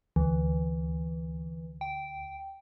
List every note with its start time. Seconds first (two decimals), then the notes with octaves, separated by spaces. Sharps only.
0.16 D2 E3
1.81 G5